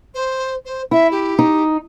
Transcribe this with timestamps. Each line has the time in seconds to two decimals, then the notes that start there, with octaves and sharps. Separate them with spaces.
0.14 C5
0.65 C5
0.91 E4 E5
1.11 G4
1.39 D#4